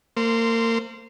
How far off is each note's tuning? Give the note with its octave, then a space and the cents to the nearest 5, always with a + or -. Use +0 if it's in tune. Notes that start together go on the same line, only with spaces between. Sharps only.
A#3 -30 C5 +0 C6 -10